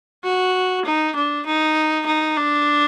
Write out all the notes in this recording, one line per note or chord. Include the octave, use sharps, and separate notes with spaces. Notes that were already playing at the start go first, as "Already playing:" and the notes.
F#4
D#4
D4
D#4
D#4
D4